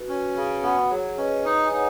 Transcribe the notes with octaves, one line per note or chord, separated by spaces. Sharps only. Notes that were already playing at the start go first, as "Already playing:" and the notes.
Already playing: F#4 B4
C#4
C#3
B3
F#3 G#4 C#5
C#4 B4 D#5
D#4 B4 D#5
G#5
D#4 C#5 F#5